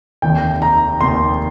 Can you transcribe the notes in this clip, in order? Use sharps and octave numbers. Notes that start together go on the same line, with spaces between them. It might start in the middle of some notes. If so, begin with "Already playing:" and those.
F1 D#2 D#3 G5
A#5
F1 D#2 D#3 C6